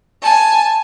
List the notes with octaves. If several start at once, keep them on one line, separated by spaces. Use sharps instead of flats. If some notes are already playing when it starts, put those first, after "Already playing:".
G#5 A5